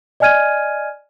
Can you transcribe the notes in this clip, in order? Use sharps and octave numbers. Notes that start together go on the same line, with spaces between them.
D5 D#5 G#5 F6 G#6 D#7